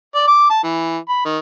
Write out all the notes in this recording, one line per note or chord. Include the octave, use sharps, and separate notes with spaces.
D5
D6
A5
E3
B5
D#3